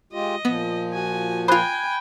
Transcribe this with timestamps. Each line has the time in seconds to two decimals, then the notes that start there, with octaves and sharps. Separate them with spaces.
0.13 G#3 F4 G4 D#5
0.45 A#2 F3 B3
0.92 F#4 G#5
1.48 F4 C5 G5 G#5 B5 F#6 G#6